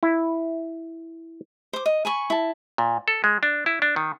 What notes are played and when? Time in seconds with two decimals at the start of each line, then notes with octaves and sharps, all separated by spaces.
0.03 E4
1.73 C5 D6
1.86 D#5
2.05 G#5 B5 C#6
2.30 E4 A5
2.78 A#2
3.08 A4
3.24 G#3
3.43 D4
3.66 E4
3.82 D4
3.96 D#3